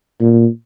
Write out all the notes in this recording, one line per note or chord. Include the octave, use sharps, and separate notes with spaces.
A#2